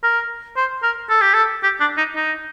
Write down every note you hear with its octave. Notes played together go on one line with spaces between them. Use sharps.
A#4
C5
A#4
A4
G4
A4
G4
D4
D#4
D#4